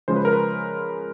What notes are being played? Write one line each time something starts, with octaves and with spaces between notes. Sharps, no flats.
C#3 F3 G#3 C5
B4
A#4
B4